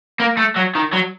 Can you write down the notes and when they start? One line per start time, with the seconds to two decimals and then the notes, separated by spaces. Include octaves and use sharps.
0.20 A#3
0.37 A3
0.56 F#3
0.75 D#3
0.93 F#3